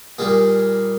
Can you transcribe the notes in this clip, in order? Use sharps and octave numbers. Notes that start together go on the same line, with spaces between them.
A#2 G3 A#3 G#4